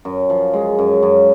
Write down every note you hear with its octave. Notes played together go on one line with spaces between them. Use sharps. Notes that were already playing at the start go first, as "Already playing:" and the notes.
F#2
F3
G#3
F#2
F#2